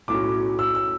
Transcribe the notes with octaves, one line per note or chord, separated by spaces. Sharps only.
B1 A2 F#3 C#4 D6
E6
E6